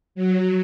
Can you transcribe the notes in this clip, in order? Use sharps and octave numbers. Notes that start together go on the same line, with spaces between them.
F#3